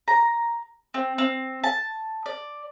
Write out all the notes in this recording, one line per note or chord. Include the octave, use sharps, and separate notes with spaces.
A#5
C4
C4
A5
D5